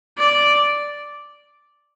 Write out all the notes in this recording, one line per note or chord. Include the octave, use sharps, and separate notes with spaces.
D5